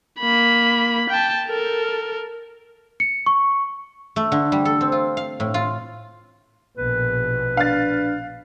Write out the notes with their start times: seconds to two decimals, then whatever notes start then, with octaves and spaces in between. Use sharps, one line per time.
0.19 A#3 B5
1.10 G5 A5
1.47 A4 A#4
3.00 C#7
3.26 C#6
4.16 A3
4.32 D3
4.52 G3
4.65 A4
4.81 C4
4.92 F4
5.17 F5
5.40 A2
5.54 F4
6.77 A#1 B2 B4
7.57 D4 F5 A6